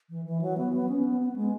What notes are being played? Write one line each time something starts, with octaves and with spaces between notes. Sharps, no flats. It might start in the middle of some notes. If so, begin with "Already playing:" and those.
E3
E3
F#3
B3
B3
C#4
B3
B3
G#3